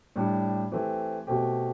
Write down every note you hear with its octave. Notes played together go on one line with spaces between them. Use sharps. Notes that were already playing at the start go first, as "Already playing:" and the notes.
A2 G3 D4
E3 A3 C4 G4
B2 A3 C4 G4